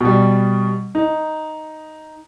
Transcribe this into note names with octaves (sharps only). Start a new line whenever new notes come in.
B2 G3
D#4